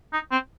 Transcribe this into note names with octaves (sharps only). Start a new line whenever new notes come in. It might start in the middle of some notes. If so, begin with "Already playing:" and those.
D#4
C4